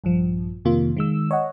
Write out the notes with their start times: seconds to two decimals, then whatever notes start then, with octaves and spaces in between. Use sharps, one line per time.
0.04 A#1 G2 F3
0.65 F2 C3 D#3 A#3 F4
0.97 D#3 G#3 E6
1.31 C#5 D#5 F#5